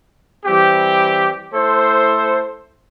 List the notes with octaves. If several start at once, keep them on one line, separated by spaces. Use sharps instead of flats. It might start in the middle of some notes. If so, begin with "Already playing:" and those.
E3 G3 C4 G4
A3 E4 A4 C5